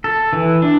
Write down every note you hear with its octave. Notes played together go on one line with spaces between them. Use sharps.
A4
E3
D4